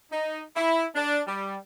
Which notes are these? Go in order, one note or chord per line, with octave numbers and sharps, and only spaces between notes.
D#4
E4
D4
G3